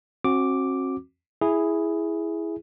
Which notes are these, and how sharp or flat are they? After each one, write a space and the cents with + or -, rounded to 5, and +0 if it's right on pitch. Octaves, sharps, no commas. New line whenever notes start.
C4 +40 F#4 -15 D6 +0
E4 +0 G#4 +0